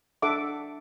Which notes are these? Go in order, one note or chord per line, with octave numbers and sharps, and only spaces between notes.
D4 A4 E5 F#5 D6